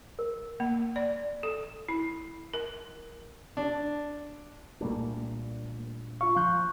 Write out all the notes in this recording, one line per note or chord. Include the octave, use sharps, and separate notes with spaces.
A#4
A#3
D5
A4
E4
A#4
D4
C2 A#2 G3 A3 A#3 D4
F4 F5 C#6
F3 C6 F#6 G6